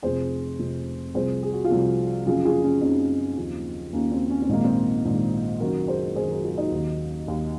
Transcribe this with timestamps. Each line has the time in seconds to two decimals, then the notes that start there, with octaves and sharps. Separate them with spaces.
0.03 F1 F2 C3 G#4 C5
0.59 F1 F2 C3
1.14 C2 C3 F3 G#4 C5
1.43 G#4
1.53 F#4
1.64 F4 G#4
1.70 C2 C3 F3
2.26 F#1 F#2 C#3 F3 F4 G#4
2.45 F4 G#4
2.63 C#4 F4
2.81 F#1 F#2 C#3 F3 C4 D#4
3.37 D#2 C#3 F3
3.93 D#2 C#3 F3 A#3 C#4
4.12 C4
4.30 C#4
4.42 C4
4.49 A#1 G#2 D#3 A#3
4.64 C4
5.05 A#1 G#2 D#3
5.60 F#1 F#2 D#3 F#4 A#4
5.88 G#4 C5
6.16 F#1 F#2 D#3 G#4 C5
6.30 F#4 A#4
6.43 F4 G#4
6.58 D#4 F#4
6.72 D#2 D#3
7.28 D#2 D#3